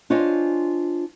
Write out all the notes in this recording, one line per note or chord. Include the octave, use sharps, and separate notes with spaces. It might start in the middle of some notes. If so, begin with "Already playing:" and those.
D4 F4 C5 C#5 D#5 G#5